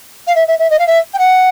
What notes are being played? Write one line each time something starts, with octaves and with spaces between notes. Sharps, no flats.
F5
E5
E5
E5
D#5
F5
E5
G5
F#5